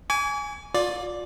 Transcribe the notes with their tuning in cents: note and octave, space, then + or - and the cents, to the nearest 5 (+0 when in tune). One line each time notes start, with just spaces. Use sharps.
G#5 +0 D6 -45
F4 +30 D5 +0